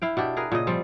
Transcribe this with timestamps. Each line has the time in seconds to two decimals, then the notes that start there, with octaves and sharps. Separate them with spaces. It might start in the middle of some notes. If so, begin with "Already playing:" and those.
0.02 E4 F5 G5
0.17 B2 D4 G4
0.37 G#4 A#4 B4
0.52 A#2 C#3 D#5
0.67 F3 G3 C4